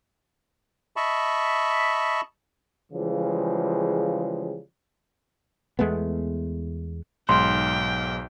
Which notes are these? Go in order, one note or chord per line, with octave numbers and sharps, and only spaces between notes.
D#5 E5 A5 B5 C#6
C#3 E3 F3 G3 G#3
E2 G#3 A3 B3
B1 G#2 G5 C6